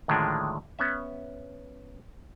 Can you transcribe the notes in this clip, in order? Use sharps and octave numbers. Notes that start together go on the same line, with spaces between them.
A2 D3 D#3 F3 G#3 D4
B3 C#4 E5